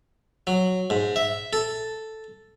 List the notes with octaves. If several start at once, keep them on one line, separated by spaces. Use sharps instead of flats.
F#3
G#2
E5
A4